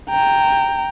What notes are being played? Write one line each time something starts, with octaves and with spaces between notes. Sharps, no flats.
G5 A#5